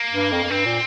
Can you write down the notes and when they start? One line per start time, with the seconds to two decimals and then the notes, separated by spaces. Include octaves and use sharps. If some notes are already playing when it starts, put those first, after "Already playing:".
Already playing: A#3
0.12 G2
0.32 F2
0.43 F2
0.50 G2 C4
0.65 A#2